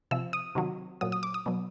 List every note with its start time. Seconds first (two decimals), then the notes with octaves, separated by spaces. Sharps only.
0.11 C3 F3 E6
0.33 D#6
0.55 C3 D#3 F#3
1.01 A#2 F#3 D#6
1.12 D#6
1.23 D6
1.34 D#6
1.46 B2 F#3